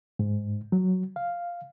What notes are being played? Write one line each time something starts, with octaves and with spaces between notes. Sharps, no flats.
G#2
F#3
F5